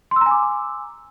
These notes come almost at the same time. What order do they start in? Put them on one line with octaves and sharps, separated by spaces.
C6 E6 A#5 G#5 D6